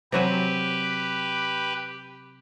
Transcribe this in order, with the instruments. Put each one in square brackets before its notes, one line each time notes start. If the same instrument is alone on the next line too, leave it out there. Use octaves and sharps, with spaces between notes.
[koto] C3 F#3 G#5 [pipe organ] G4 B4